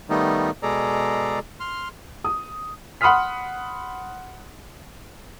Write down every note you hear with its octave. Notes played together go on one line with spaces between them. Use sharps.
D#3 G3 A3 B3 D#4
B2 G#3 G#4 A4 D5 A#5
C6 F6
D#6
F#5 B5 C6 D#6 F6 B6